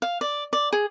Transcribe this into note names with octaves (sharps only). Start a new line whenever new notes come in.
F5
D5
D5
G#4